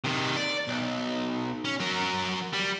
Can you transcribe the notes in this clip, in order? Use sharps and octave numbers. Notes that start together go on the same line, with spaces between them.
C3 D#3
D5
B1
C#4
F#3 A#4
G3